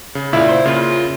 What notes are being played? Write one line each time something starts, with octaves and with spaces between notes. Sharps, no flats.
C#3
C#2 A#2 E4 D5 F5
C5 C6
C#3 A#3 F4